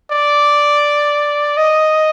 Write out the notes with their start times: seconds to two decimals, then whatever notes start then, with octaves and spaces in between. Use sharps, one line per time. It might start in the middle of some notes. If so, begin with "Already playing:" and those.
0.11 D5
1.57 D#5